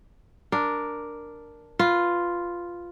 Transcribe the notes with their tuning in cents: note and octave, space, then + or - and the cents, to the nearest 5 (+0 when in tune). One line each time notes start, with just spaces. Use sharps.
D4 +0 A#4 +0
F4 +0 B4 +0